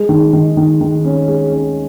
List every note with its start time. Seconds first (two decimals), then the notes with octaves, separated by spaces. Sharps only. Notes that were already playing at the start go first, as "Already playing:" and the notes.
Already playing: G#3
0.09 D#3
0.33 D#3
0.57 D#3
0.81 D#3
1.05 C#4
1.28 G#3
1.52 C#4